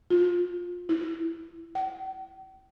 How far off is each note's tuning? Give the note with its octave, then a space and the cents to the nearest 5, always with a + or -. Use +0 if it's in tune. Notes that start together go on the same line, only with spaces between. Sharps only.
F4 +20
E4 +10
G5 -45